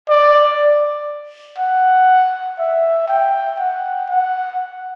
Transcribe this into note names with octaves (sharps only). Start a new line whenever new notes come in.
D5
F#5
E5
G5
F#5
F#5